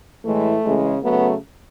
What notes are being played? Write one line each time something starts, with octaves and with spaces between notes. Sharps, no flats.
A2 E3 G#3 A3
C#3 E3 G#3
C#3 F#3 A3 B3